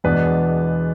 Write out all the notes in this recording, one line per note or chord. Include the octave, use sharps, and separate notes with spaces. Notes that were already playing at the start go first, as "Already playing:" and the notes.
E2 B2 G#3 B3 D4 B4